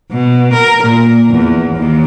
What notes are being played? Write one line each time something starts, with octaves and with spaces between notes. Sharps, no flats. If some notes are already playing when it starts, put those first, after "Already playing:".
B2
A#4
A#2
E2
D#2